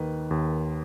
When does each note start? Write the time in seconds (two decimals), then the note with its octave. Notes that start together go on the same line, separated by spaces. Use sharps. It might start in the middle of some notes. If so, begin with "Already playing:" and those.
Already playing: D#2 D#3 B4
0.31 D#2